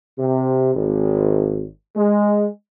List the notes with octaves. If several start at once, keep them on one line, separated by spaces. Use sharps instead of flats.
C3
G#1
G#3